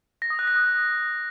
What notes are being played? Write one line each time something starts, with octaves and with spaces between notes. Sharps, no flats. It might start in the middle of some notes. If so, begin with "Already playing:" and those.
A#6
D#6
F#6
A#6
D#6